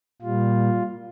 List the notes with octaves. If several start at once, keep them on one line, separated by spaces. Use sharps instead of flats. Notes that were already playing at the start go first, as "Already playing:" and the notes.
A#2 G3 F4